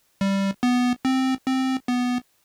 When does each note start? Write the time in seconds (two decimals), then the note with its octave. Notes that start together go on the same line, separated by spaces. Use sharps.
0.21 G3
0.63 B3
1.05 C4
1.47 C4
1.88 B3